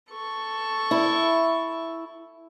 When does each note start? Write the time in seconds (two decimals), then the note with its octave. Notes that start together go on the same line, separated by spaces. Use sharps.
0.11 A4 C#6
0.91 E4